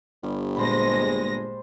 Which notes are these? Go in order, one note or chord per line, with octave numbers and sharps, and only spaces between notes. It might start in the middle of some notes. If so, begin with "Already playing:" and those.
G1 G3
A#2 G#3 C5 A5 B5 A#6